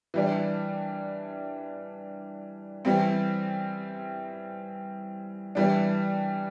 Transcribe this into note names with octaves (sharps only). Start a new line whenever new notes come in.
E3 G3 D4
E3 G3 C4
E3 G3 D4